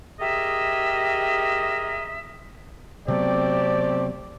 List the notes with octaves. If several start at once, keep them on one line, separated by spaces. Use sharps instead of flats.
G4 G#4 A#4 D#5 E5
C3 F#3 A3 B3 C4 G4 D5